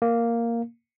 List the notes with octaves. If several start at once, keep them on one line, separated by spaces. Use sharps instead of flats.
A#3